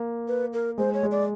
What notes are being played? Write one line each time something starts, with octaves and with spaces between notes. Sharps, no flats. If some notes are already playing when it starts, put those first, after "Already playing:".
Already playing: A#3
B4
A#4
G#3 C5
C#5
G#3
D5